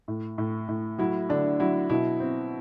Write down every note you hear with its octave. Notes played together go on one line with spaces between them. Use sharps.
A2
A2
A2
F#3 E4
D3 D4
F#3 E4
B2 E4
C4